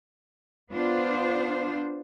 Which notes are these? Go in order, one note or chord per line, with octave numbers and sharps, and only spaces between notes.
B3 D4 F4 C5